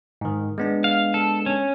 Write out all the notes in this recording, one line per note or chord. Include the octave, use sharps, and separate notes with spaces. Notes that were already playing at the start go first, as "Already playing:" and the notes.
G#2 D#3
G#3 B3 D4
F5
A4
C#4